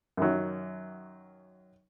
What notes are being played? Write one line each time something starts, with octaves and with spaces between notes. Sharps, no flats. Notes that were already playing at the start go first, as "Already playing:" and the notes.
F#2 D#3 F#3